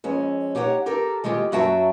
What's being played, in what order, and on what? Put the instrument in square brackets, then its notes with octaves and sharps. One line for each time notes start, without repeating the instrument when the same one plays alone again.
[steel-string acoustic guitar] F2 G#3 C#4
D#4 G4 C#5 E5 F#5
G4 A4 A#4
D#3 G#3 F4 G4
F#2 F#3 F#4 E5 G5 A5